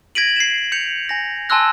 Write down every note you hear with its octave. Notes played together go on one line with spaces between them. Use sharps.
G#6 A#6 B6 D7 D#7 F#7
C7 E7
G6 C#7 F7
G#5 A#6
G#5 A5 C6 E6 F#6 A#6